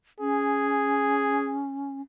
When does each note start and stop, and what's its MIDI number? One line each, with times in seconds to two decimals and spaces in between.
0.20 2.01 61
0.20 1.61 68